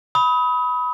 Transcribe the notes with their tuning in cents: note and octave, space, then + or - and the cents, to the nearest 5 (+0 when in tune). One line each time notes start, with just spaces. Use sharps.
B5 +0 D#6 +35